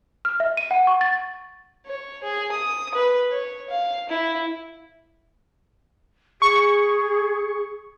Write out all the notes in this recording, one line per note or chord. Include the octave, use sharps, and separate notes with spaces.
F6
E5
D#7
F#5
C#6
A6
C#5
G#4
D#6
B4
C#5
F5
E4
G#4 C#6